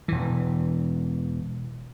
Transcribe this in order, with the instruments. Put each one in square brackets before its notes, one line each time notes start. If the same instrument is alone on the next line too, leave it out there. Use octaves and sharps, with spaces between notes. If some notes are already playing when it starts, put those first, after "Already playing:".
[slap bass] E1 E3